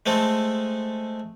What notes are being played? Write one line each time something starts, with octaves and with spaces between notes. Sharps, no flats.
G#3 A3 C4 A4